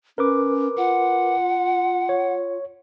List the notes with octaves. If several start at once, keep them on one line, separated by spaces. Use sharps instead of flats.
C#4 A#4 B4 D6
F4 F#5
C#5